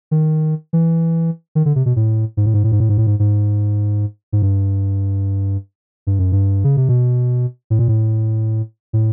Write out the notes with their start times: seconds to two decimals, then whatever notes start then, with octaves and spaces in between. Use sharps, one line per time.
0.11 D#3
0.73 E3
1.55 D#3
1.65 D3
1.75 C3
1.86 B2
1.96 A2
2.37 G#2
2.46 A2
2.54 G#2
2.64 A2
2.72 G#2
2.80 A2
2.89 G#2
2.98 A2
3.07 G#2
3.19 G#2
4.33 G#2
4.42 G2
6.07 G2
6.19 F#2
6.32 G2
6.64 C#3
6.77 C3
6.89 B2
7.70 A2
7.79 A#2
7.88 A2
8.93 A2